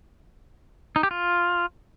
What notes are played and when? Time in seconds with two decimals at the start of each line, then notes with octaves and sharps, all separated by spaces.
0.96 D#4
1.03 G4
1.11 F4